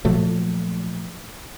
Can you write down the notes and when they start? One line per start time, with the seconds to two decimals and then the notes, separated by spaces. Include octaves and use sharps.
0.05 A#2 F3 F#3 A3